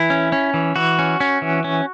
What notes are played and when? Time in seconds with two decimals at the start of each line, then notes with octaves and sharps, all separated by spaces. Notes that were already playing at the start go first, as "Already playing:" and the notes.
Already playing: E3 E4
0.10 C#4
0.32 C#4
0.54 E3
0.76 E3 F#4
0.99 C#4
1.20 C#4
1.42 E3
1.64 C#4